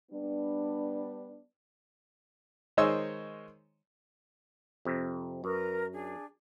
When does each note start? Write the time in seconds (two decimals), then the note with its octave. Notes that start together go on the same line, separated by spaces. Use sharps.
0.12 G3 B3 D4
2.77 D#3 G#3 C5 C#5 D#5 E6
4.85 F2 C3
5.44 F#2 A#4 B4 A#5
5.91 D4 G#4